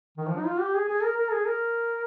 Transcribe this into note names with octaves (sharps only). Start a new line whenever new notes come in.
D#3
F3
D#4
F4
G4
G#4
G#4
A#4
A#4
G#4
A#4